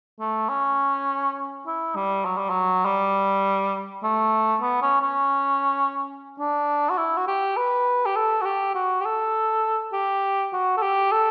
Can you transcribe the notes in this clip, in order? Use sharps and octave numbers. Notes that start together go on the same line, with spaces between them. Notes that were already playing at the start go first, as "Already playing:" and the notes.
A3
C#4
E4
G3
F#3
G3
F#3
G3
A3
B3
C#4
C#4
D4
F#4
E4
F#4
G4
B4
G4
A4
F#4
G4
F#4
G4
A4
G4
F#4
A4
G4
A4